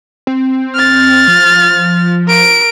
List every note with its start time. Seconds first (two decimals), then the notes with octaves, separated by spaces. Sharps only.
0.27 C4
0.75 F6 A6
1.28 F3
2.28 A#4 D7